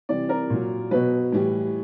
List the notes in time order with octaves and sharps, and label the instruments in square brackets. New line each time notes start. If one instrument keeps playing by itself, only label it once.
[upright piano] C3 E3 G3 D5
A#4
A#2 F#3
B2 F#3 B4
A2 E3 G3